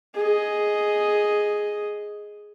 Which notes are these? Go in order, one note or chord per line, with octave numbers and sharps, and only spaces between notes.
G#4 D#5